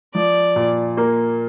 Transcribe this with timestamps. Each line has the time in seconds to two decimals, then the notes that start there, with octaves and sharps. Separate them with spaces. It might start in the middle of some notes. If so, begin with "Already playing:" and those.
0.15 F3 D5
0.56 A#2
0.97 A#3